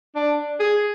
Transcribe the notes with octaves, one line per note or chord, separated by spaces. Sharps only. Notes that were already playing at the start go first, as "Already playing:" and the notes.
D4
G#4